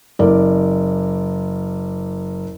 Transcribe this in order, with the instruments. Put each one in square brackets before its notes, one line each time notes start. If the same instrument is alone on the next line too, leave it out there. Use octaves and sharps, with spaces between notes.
[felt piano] F#1 A#4 D5